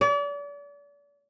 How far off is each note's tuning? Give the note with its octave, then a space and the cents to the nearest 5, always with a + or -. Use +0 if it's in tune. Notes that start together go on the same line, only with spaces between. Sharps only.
D5 -40